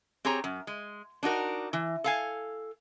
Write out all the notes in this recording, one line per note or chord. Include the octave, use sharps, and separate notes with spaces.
C4 G4 G#4 C#5 A#5
F#2
G#3
D4 D#4 F#4 A#4
E3
A4 F5 G#5